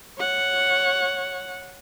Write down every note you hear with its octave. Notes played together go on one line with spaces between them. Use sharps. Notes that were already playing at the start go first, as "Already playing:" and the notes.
C#5 F#5